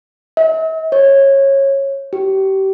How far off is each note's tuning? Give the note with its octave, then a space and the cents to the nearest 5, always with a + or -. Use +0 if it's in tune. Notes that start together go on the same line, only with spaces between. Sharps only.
E5 -45
C#5 -20
G4 -30